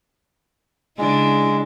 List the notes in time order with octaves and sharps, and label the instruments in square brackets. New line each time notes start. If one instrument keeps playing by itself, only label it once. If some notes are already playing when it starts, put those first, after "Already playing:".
[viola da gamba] C#3 D4 E4 [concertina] G#3